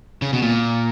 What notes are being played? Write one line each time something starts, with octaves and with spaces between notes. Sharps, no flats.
C#3
B2
A#2